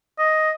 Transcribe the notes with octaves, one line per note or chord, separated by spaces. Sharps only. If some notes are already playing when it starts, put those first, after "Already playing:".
D#5